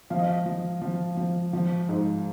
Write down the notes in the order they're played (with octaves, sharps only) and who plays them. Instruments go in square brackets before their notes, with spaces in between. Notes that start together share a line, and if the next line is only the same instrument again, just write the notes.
[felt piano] F3 F5
D#5
F5
F3
F3
F3
F3
G#2